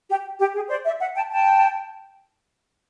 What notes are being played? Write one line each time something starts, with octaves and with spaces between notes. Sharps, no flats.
G4
G4
G#4
C5 D5
D5 E5
E5 F#5
G5 A5
G5 A5